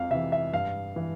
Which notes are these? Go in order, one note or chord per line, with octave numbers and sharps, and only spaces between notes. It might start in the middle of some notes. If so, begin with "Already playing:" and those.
Already playing: F2 F5
C3 E3 E5
E5
G2 F5
E3